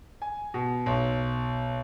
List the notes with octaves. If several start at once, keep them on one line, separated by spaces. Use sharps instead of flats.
G#5
B2
B1